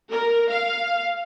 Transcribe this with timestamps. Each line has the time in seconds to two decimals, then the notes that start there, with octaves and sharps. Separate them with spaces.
0.11 A#4
0.50 F5